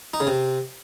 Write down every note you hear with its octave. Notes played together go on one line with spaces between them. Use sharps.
D#4
C#3
C3